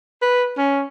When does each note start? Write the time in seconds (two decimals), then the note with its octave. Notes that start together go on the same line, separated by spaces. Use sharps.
0.22 B4
0.57 C#4